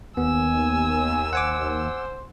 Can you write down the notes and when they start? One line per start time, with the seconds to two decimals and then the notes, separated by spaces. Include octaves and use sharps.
0.17 D#2 B3 G#5 E6
1.33 C5 F#5 G#5 D6